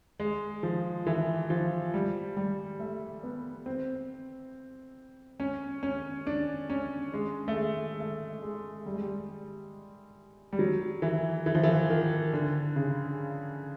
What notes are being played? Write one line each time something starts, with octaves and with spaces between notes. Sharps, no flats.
G#3
F3
E3
F3
G3
G3
A3
B3
C4
C#4
C#4
D4
C#4
G#3
A3
G#3
A3
G#3
G3
G#3
G3
G3
F#3
E3
E3
F3
E3
D#3
D3
C#3